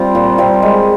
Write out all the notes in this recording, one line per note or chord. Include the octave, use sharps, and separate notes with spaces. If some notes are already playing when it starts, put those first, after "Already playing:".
Already playing: G3 C4 F4
A#2
G3 C4 F4
G#3